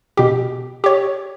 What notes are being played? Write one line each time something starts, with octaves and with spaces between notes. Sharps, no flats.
B2 G4
G4 C#5